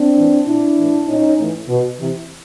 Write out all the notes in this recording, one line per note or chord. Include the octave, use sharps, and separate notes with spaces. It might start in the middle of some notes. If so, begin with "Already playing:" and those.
Already playing: C4 D4
A2 E3
A#2 D4 E4
A2 E3
A#2 C#4 D#4
A2 E3
B2
C3 E3